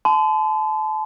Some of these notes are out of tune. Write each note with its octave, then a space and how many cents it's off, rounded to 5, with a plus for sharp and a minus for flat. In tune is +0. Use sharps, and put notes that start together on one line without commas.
A5 -30 C6 -40